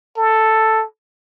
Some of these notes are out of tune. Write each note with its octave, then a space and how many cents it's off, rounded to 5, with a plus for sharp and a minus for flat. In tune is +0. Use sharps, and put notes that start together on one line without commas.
A4 +5